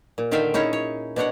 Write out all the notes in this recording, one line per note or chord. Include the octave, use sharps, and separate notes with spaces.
A#2
D3 D#3 F4 E5 F5 G5
C#4 D#4 E4 G#4 C#5
C#5
B2 D4 C#5 F#5